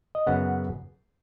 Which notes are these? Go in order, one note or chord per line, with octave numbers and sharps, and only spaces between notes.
D#5
F#2 C#3 B3 F#5